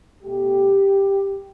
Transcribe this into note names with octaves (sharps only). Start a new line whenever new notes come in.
B2 A3 G4